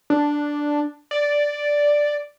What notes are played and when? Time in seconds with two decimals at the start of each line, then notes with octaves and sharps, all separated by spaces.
0.10 D4
1.11 D5